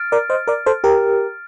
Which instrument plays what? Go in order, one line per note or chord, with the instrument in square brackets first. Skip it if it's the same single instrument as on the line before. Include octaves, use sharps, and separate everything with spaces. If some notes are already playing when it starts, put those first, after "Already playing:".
Already playing: [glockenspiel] F6 A6 D7
[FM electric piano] A#4 D5
C5 D#5
A#4 D5
A4 C5
G4 A#4